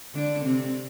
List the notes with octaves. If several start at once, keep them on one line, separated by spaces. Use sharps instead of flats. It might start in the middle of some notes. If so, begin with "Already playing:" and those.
D3 D4
C3 C4